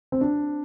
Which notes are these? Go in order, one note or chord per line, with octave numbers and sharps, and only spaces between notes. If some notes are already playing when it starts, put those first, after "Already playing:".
C4
D4